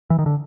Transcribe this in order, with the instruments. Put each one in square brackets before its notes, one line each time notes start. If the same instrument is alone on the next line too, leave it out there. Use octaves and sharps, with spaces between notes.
[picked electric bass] E3
D#3
D3